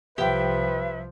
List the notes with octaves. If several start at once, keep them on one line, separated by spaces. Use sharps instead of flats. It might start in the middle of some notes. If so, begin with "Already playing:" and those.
C2 F3 G4 B4 E5 G5